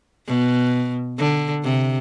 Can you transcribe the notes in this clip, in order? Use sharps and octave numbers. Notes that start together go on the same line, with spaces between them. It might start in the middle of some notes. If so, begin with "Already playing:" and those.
B2
D3
C3